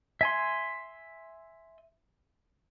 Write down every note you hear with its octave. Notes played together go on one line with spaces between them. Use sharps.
E5 G#5 C6